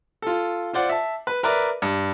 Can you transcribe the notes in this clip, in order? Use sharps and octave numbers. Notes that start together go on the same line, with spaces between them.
F4 A4
F4 C5 D5 F#5
E5 A5
B4
A#4 B4 D5 E5
G2